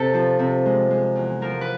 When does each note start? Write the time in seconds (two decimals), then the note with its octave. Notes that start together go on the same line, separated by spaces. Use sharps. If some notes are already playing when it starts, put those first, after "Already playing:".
Already playing: C3 A4
0.14 F3
0.39 C3
0.66 G#3
0.90 G#3
1.15 E2
1.41 F3 A#4
1.61 B4